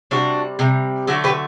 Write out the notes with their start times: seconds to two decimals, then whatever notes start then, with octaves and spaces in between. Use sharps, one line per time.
0.11 C3 G3 D4 F#4
0.59 C3 G3
1.07 D3 F#3 A3 D4 F#4
1.24 G4 B4